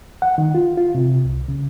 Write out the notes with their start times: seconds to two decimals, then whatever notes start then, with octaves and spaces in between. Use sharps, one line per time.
0.22 F#5
0.38 D#3
0.55 F4
0.78 F4
0.95 C3
1.25 C2
1.48 C#3